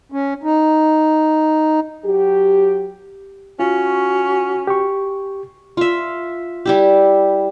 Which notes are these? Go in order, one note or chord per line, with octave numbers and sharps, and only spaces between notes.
C#4
D#4
F#3 G4
C#4 F4 F#4
G4 C#6
F4 E5
G3 E4 G4